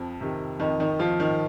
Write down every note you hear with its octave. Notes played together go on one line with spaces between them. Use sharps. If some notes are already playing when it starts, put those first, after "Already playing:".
Already playing: F2 F3
C3 D#3
F2 D#3 D#4
D#3 D#4
D#3 F3 F4
D#3 D#4